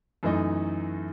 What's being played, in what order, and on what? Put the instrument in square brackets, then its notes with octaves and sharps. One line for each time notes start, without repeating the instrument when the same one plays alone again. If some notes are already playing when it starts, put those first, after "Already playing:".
[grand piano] F#2 E3 A3 D#4